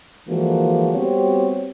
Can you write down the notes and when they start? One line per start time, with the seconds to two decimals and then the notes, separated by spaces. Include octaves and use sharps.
0.28 D3 E3 F3 G#3 A#3 F#4
0.94 G3 B3 C4 F#4 G4 C#5